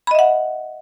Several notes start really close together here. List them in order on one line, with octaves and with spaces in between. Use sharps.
B5 D#5 E5 F#5